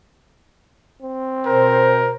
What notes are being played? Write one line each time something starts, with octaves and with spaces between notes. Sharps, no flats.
C4
B2 A#4 C5